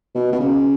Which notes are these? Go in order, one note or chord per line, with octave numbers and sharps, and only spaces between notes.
B2
B2
C#3